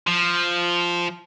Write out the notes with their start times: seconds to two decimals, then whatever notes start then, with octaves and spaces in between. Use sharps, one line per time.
0.07 F3